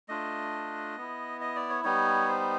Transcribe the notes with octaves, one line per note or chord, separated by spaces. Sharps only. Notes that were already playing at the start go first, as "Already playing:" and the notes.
A3 D4 F4 D#5
B3 E4
D#5
D5
C#5
G3 B3 D#4 C#5
C5